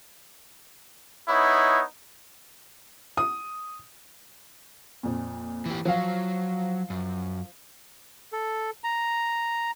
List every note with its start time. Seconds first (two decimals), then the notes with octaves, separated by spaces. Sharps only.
1.29 B3 D#4 E4 C#5
3.17 D#6
5.03 F2 A#2
5.66 E3 G4
5.85 F3 F#3 F5
6.90 F#2
8.33 A4
8.84 A#5